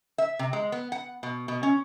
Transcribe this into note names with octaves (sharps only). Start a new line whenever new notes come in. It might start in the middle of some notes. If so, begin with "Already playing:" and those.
E5
C3
G#3
B3
F#5
B2
B2
C#4